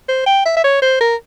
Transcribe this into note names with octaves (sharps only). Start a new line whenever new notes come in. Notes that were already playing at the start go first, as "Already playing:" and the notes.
C5
G5
E5
E5
C#5
C5
A#4